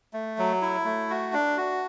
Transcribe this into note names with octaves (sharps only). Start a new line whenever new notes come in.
A3
F#3
E4
A3
F#4
D4
F#4